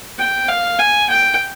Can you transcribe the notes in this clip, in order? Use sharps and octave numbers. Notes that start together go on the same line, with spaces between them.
G5
F5
G#5
G5